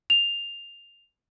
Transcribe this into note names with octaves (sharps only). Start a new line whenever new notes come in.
F7